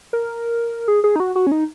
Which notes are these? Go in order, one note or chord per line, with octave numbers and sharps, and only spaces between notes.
A#4
G#4
G#4
D#4
F#4
F#4
C#4
D#4